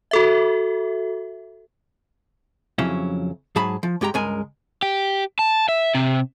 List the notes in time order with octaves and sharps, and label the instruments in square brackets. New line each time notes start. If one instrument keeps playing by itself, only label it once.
[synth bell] F#4 A4 E5
[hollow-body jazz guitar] F2 C#3 F#3 C#4 E4
G#2 F#3 G#4 A5 B5
F3
G2 G#3 G4 G5 A#5
C#2 G2 G#3 A#4 G#5
[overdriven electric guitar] G4
A5
E5
C3